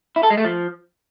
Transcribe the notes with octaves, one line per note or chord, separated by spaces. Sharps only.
E4
A4
G#3
A3
F3